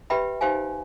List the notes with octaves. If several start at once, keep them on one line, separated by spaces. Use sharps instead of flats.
G4 B4 E5 G5 B5
D#4 G4 C5 F5 G#5